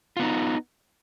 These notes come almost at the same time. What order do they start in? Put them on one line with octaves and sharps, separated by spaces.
F4 B3 D#4